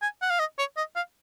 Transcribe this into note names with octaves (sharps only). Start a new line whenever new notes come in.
G#5
F#5
F5
D#5
C#5
D#5
F5